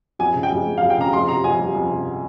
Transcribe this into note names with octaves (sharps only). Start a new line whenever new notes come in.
F2 G#5
C#3
G5
F2
G#3
F2 F5
G5
C#3 A#5
F2 C6
C3 A#5
F2 G#5
G3
F2
C3